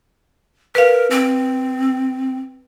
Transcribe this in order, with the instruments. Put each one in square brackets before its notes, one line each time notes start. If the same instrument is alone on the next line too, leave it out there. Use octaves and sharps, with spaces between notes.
[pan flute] A#4 [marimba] B4 F5
[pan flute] C4